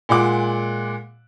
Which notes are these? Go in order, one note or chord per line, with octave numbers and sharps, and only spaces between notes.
A#2 G#3 F#5 D6